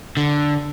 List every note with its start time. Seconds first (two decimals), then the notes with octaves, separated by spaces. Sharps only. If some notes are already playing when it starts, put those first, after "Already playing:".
0.17 D3